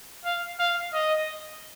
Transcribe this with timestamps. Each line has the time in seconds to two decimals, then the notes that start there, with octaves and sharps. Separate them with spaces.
0.25 F5
0.59 F5
0.93 D#5